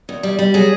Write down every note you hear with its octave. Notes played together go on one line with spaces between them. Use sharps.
E2
G3
G3
F#3 G#4